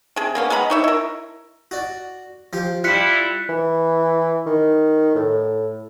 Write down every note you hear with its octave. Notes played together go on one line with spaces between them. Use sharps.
C3 G#4
A#3 B3 C#4
G#3 B3 A#5 B5
D#4 C#5 E5
E4 A#4
F#4 D5
F3 G4
G3 E4 F4 F#6 B6 C#7
E3
D#3
A2